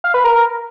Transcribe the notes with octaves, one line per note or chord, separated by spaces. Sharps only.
F5
B4
A#4